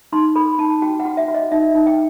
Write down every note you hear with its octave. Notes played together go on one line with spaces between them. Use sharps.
D#4 C6
A4 B5
D#4 A5
F#4 G5
F#5
F#4
E5
F#4
D#5
D#4 E5
D#4
G5